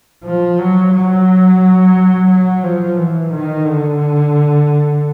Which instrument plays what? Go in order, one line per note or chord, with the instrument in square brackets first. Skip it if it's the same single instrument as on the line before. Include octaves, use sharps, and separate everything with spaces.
[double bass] F3
F#3
F#3
F#3
F3
E3
D#3
D3